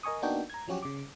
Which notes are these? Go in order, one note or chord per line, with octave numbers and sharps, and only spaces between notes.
A#4 D#5 G#5 C#6 D#6
A#3 B3 D4 D#4 F#4 G5
A#5 G#6
F3 F#3 C#4 F#4 G4
C#3 D6